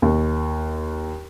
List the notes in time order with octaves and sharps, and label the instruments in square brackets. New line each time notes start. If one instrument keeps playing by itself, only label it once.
[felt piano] D#2